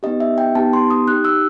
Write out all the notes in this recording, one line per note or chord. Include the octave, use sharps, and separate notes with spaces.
B3 D#4 G4 D#5
E5
G5
B3 D#4 G4 A5
C6
D#6
D#4 G4 F#6
E6